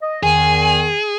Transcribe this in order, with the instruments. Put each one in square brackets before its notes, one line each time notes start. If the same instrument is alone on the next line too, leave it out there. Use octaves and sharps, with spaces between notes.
[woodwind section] D#5
[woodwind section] E2 D#3 [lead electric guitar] G#4 [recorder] G#5